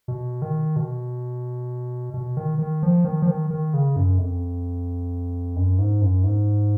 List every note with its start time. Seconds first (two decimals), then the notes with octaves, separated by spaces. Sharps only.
0.08 B2
0.42 D#3
0.76 B2
2.14 B2
2.37 D#3
2.59 D#3
2.83 F3
3.05 D#3
3.22 F3
3.28 D#3
3.50 D#3
3.74 C#3
3.96 F#2
4.18 F2
5.56 F#2
5.79 G#2
6.02 F#2
6.24 G#2